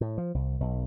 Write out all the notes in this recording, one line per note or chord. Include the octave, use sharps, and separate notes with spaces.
A2
F3
C2
B1